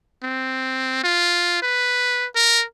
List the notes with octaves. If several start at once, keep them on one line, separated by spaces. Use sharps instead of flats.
C4
F4
B4
A#4